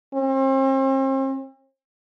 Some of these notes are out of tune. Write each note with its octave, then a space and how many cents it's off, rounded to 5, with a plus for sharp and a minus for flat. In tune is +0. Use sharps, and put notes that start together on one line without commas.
C4 +40